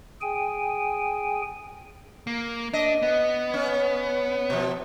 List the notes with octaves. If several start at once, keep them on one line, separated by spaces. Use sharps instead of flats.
G#4 G5 G#5
A#3
D4 D#5
B3
C#4
B2 F3